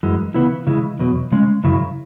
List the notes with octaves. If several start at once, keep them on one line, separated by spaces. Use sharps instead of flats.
F#2 E3 G#3
C#3 E3 B3 E4
C#3 E3 G#3 E4
E2 B2 F#3
C#3 G#3 C#4
F#2 C#3 F#3 E4